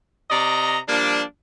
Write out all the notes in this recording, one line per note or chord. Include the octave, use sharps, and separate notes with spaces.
C3 D5 D#5 A#5
F3 G3 A#3 D4